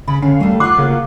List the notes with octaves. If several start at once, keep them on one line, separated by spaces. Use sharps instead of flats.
C#3 B5
D3 C#4 F5
G3 A3 A#3
F4 F#4 D6 F#6 C7
C#3 A#3